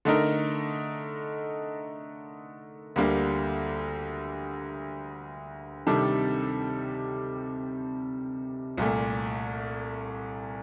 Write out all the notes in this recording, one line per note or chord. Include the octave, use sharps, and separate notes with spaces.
D3 A3 D#4 A#4
D2 D3 G3 A#3
C3 D#3 G3 D4 A4
C2 A#2 A3